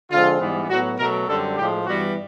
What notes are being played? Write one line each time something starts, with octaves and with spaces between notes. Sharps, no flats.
D3 F3 G#3 C4 F4
G#2 E3 G3 B3
A2 F#3 B3 F#4
B2 F#3 A3 A#4
F#2 D3 G3 C4 A4
A2 F3 G#3 G4
G2 E3 G3 B3 F#4